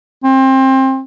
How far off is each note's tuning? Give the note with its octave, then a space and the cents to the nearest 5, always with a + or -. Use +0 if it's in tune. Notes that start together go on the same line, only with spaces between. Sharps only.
C4 +25